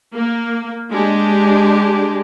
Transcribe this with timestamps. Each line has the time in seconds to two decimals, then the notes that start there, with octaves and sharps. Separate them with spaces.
0.14 A#3
0.91 G#3 D4 G4